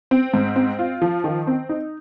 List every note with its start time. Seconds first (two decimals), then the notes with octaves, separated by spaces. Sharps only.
0.11 C4
0.34 G#2
0.56 C4
0.79 F4
1.02 F3
1.24 D#3
1.47 C4
1.69 D#4